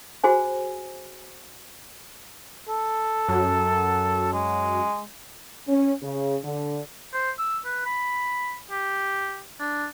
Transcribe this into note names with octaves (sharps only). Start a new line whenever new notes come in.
F#4 G#4 C5 G#5
A4
F#2 F#3
G#3
C#4
C#3
D3
C5
E6
B4
B5
G4
D4